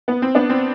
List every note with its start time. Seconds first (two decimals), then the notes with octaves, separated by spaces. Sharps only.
0.08 B3
0.22 C4
0.35 B3 D4
0.49 C4